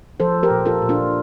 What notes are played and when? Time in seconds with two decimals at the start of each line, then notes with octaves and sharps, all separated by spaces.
0.20 F3 A4 C5
0.43 G4 A#4
0.50 A#2
0.66 F4 A4
0.82 A#2
0.89 D4 F4